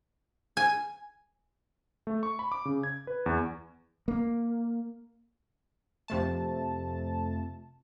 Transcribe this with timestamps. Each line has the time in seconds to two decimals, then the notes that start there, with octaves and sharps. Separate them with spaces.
0.57 G#5
2.07 A3
2.23 C#6
2.39 B5
2.52 D6
2.65 C#3
2.83 G#6
3.07 B4
3.26 E2
4.08 A#3
6.08 F2 C3 A3 A5